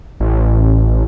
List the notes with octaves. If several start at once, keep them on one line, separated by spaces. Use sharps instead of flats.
A1